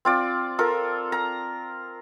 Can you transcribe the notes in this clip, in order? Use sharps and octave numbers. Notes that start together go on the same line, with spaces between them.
C4 F4 D5
F4 A4 A#4
A#5